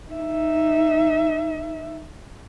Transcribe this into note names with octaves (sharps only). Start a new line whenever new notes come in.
D#4 E5